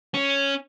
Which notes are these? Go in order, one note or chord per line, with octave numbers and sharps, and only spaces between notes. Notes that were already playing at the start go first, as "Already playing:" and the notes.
C#4